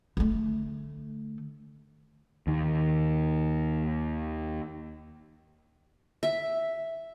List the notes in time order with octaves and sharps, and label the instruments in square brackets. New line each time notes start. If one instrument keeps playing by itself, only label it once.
[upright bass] D3 A3
[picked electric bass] D#2 D#3
[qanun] E5